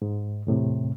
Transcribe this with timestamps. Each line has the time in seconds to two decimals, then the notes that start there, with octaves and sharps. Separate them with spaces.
0.02 G#2
0.47 E2 A2 C3